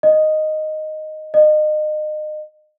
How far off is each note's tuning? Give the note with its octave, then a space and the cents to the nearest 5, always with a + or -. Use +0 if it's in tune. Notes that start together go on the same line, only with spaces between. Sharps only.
D#5 -5
D#5 -30